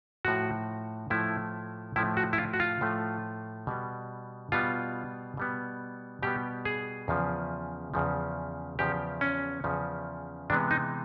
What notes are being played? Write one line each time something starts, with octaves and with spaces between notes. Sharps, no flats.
A2 F3 A3 F#4
A2 F3 A3 E4
A2 F3 A3 E4
F#4
E4
F4
F#4
F4
A2 F3 A3
B2 G3 B3
B2 G3 B3 F4
B2 G3 B3
B2 G3 B3 G4
G#4
E2 C#3 F3
E2 C#3 F3
E2 C#3 F3 G4
C#4
E2 C#3 F3
C3 E3 G#3 B3 D4
D#4